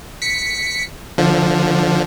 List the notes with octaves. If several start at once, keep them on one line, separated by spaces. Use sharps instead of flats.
B6 C#7
D3 F3